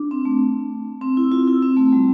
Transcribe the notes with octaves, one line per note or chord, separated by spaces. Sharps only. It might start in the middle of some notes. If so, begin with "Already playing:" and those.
Already playing: D4
C4
A3
C4
E4
F4
E4
C4
A3
G3